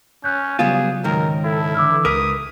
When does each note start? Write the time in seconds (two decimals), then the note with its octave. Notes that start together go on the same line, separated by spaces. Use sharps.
0.24 C#4 F#6 G6
0.59 C#3 F#3 G3 B3 F4 G#4
1.04 C#2 G#2 D#3 A#4
1.44 E4 A4
1.75 D3 E3 D6 E6 F6
2.05 C#2 A#4 B4 D#6 F6 B6